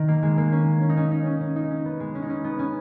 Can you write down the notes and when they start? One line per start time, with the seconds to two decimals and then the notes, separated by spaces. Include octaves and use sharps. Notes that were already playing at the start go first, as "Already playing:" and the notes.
Already playing: D#3
0.08 A#3
0.23 G#3
0.38 A#3
0.52 C#4
0.82 C#4
0.89 D#4
0.97 C#4
1.11 D#4
1.26 C#4
1.41 C#4
1.56 D#4
1.71 C#4
1.85 B3
2.00 G#3
2.15 C#4
2.22 D#4
2.30 C#4
2.44 B3
2.59 C#4